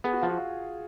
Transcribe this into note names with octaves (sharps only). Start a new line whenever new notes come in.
B3 G#4
F#4
F3 F4
F#4